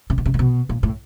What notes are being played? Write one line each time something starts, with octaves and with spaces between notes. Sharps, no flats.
C3
B2
C3
A#2
B2
A#2
A2